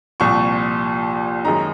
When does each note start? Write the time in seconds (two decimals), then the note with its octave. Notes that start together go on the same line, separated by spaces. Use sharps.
0.20 C2 A#2 F3 C#6
1.45 F#2 D#3 G#3 D#4 A#5